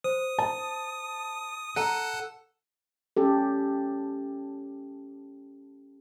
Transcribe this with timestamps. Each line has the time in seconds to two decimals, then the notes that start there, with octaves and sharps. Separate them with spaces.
0.04 C5 D#6
0.38 A5
1.76 A4 F#5 A#5 D#7
3.17 C#4 G4 A4